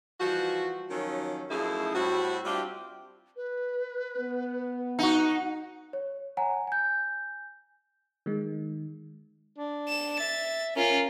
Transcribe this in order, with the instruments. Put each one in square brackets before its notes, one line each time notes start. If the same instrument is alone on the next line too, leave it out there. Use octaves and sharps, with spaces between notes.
[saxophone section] E3 F3 G3 F#4
D#3 F3 F#3 C#4
F#2 F3 A3 D#4 E4 G#4
A2 G3 C4 F#4
G3 C4 D4 E4 F4 G4
[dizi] B4
[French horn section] B3
[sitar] D#4 F#4 [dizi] F#5
[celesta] C#5
C#5 F#5 G#5 A#5
G#5 G6
[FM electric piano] D#3 G#3
[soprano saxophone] D4
[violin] E7
[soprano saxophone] E5 [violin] A6
[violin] C#4 F4 [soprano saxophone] A#4